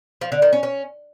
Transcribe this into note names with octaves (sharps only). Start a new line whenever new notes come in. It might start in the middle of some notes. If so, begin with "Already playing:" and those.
F3
D3
D#3
C#4
C#4